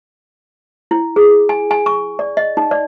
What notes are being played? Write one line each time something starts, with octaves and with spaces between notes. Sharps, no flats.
E4
G#4
G#5
G#5
C#6
D5
D#5
D#4
D5